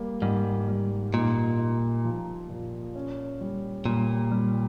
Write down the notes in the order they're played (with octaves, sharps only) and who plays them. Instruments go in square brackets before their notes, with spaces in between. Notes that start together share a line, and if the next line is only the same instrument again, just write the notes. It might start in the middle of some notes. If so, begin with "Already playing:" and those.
Already playing: [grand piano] G3 A#3
[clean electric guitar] G#2 [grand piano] G3
[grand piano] G3
[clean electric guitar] A#2 [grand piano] D#4
[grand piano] D#4
F3
A#2
C#4
G3
[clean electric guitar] A#2 [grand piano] G3
[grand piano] G3